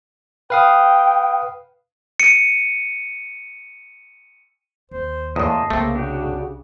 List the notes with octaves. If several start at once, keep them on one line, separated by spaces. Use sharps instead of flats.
B4 F5 G5 D#6
C#7 D#7
D#2 C5
E2 A2 A#3 D#5 A5 C6
C2 C#3 A3 A#3 C4
D4 F#4 G4